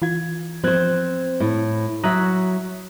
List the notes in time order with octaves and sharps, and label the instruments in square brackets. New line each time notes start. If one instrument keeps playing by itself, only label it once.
[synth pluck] E3 F4 G#6
[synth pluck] F3 F#6 G#6 [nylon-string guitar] C4 C5
[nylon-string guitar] A2
[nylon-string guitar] F#3 E5 [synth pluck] A#5 D#6 F#6